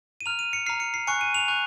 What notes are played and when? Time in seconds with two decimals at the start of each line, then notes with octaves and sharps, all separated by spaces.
0.21 D#7
0.26 A#5 F6 F7
0.39 D#7
0.53 C#7
0.66 A#5 F6 C7
0.80 C#7
0.94 C7
1.07 G#5 C#6 F#6 C#7
1.21 D#7
1.35 F7
1.48 G#5 C#6 F#6